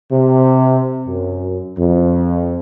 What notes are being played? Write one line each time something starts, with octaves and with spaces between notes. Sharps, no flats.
C3
F#2
F2